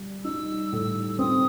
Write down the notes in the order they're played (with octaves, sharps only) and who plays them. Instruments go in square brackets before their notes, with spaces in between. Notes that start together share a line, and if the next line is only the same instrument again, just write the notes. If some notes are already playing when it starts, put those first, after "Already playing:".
Already playing: [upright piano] G3
[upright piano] D#4 [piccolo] E6
[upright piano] A2
[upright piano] C4 [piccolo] D#6